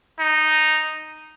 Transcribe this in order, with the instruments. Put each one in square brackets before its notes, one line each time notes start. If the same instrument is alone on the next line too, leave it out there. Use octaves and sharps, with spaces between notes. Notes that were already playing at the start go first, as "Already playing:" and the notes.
[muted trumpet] D#4